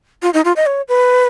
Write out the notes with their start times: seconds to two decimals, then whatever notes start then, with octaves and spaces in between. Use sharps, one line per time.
0.22 F4
0.34 D#4
0.45 F4
0.56 D#5
0.66 C#5
0.88 B4